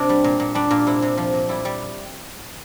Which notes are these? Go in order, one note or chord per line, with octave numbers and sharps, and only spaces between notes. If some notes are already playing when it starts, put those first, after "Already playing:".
Already playing: C3 D4
G3
A#2
A#2
G3 D4
A#2 F4
C3 E4
C3
F3
A#2
G3 E4
G3